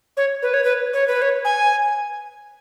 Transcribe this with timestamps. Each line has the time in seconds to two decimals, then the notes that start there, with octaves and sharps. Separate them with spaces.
0.17 C#5
0.43 B4
0.54 C#5
0.64 B4
0.93 C#5
1.08 B4
1.22 C#5
1.45 G#5